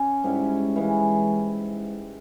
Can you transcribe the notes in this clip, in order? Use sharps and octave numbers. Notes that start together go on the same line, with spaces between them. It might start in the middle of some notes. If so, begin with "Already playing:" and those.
Already playing: C#4
G#2 G3 C#4 E4
E3 G#3 C#4